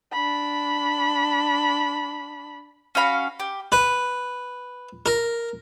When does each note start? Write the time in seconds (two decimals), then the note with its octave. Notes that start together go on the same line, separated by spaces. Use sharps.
0.12 D4 B5
2.95 C#4 F#4 F5 B5
3.40 G4
3.72 B4
5.06 A#4